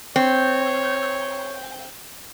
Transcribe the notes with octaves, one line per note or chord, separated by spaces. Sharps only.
C4 C#5